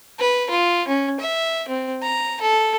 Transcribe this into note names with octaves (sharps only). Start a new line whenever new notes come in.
B4
F4
C#4
E5
C4
A#5
A4